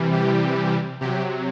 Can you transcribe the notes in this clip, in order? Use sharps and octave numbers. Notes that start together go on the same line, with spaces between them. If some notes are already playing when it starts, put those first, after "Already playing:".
Already playing: C3 E3 G3
G4
C3 F#3 G4